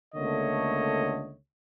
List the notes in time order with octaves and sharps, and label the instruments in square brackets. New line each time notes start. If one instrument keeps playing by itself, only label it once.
[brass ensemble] C#2 D3 A3 A#3 C#5 D#5